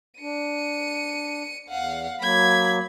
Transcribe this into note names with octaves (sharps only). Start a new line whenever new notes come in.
D4 C#7 D#7
E2 F5 F#5
F#3 A#3 B5 G#6